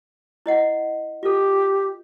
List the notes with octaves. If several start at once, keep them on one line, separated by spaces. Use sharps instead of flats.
E4 D#5 F#5
F4 G4 A4